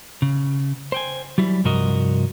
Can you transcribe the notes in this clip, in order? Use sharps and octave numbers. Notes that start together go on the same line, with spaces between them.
C#3
C5 G5 G#5
F#3 G3 E4
C2 G2 F3 F#4 A#4 D#5